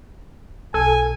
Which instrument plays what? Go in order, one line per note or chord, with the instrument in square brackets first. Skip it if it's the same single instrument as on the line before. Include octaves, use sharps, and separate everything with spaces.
[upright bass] B1 [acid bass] A4 [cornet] G#5